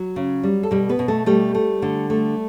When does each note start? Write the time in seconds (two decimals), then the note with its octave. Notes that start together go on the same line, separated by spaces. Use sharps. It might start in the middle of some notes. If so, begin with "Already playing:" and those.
Already playing: F#3 F#4
0.16 C#3
0.43 G3
0.63 A4
0.71 B2 G3 G4
0.89 B3 B4
0.99 B2
1.08 A3 A4
1.26 G3 A3 G4
1.55 A3
1.82 D3
2.10 A3